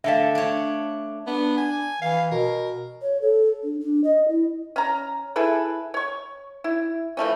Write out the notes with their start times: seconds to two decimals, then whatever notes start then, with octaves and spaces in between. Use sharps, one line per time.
0.04 D3 A3 E5 F5 A5
0.35 D4 C#5
1.27 B3 D4
1.58 G#5
2.02 E3 F5
2.31 B2 A#4
3.02 C#5
3.21 A4
3.63 D4
3.80 D4
4.04 D#5
4.29 E4
4.76 C#4 A#5
5.36 E4 G#4 A4 B4
5.94 C#5 C#6
6.64 E4
7.17 E3 F3 A3 C#4